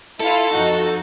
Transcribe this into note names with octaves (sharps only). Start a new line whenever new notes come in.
E4 F4 A4
F2 D#4 F#4